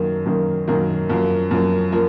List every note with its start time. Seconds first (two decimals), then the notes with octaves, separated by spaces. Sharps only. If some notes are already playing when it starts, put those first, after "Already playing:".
Already playing: F#2 D#3 A#3
0.26 F#2 D#3 A#3
0.68 F#2 D#3 A#3
1.10 F#2 F3 A#3
1.51 F#2 F3 A#3
1.92 F3 A#3